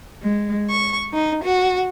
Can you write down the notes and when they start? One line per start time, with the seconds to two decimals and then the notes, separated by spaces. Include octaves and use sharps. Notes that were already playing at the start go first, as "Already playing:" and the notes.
0.23 G#3
0.69 C#6
1.12 D#4
1.42 F#4